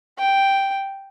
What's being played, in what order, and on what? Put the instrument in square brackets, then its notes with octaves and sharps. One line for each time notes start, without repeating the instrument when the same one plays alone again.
[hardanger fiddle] G5